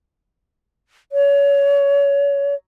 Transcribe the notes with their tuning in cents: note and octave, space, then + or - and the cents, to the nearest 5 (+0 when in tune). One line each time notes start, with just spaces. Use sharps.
C#5 +25